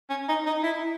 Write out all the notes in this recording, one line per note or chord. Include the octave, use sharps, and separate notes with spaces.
C#4
D#4
D#4
E4